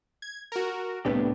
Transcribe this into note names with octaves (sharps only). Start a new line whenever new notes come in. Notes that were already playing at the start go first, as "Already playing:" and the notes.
G#6
F#4 A#4
C2 A2 B3 D4 G4